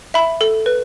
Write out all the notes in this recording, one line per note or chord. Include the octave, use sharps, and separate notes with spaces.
E5 B5
A4
B4